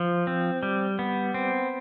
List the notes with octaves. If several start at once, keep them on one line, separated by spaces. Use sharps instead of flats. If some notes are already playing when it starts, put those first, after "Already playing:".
Already playing: F3
C4
G3
B3
C4